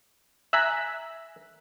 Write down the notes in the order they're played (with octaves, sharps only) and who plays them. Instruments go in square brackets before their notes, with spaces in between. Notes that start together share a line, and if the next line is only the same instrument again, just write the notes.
[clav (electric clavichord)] E5 G#5 A#5 [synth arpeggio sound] E6 F#6 B6